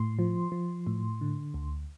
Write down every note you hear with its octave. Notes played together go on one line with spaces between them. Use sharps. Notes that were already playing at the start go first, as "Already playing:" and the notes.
Already playing: A2 C6
F3
F3
A2
D3
D2